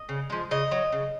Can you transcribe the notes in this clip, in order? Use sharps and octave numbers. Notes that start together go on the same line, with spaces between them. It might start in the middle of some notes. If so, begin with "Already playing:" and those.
Already playing: D#5
C#3
F3 G#3
C#3 D#5
F#3
C#3